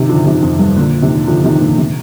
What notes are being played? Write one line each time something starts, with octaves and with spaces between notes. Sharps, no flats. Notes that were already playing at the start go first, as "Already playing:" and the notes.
Already playing: C3 D#3
D3 F3
C3 D#3
F2
G2
A#2 D3
C3 D#3
D3 F3
C3 D#3
A#2 D3
C3